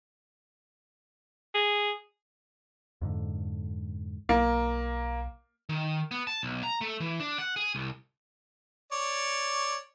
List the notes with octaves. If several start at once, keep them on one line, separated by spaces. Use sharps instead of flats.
G#4
F2 G#2 D3
B1 A#3
D#3
B3
A5
B1
A#5
A3
E3
D4
F#5
G#4
C2
C#5 D5